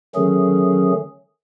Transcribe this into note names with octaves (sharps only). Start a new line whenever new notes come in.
D3 D#3 F#3 A3 C#4 G#4